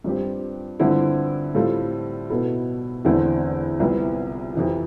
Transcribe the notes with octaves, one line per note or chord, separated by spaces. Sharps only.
G2 F3 C4 G4
G2 D3 F3 C4 E4
A2 G3 C4 F4 A4
B2 B3 E4 A4
E2 D3 A3 C4 E4
C2 C3 F3 B3 E4
F2 C3 E3